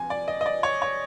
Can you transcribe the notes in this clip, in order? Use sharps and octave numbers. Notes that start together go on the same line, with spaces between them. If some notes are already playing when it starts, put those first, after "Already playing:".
Already playing: C3 F3 G#5
D5
D#5
D#5
D5
C#5
C#5